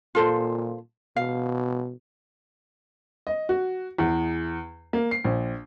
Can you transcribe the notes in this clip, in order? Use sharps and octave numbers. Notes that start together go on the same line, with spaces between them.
A#2 F4 A4 C5
B2 F5
D#5
F#4
E2
A#3
C7
A#1